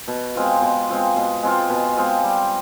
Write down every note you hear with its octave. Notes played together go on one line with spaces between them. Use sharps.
B2
G#3 C4 F4
B2
G#3 C4 F4
B2
G#3 C4 F4
B2
G#3 C4 F4
G3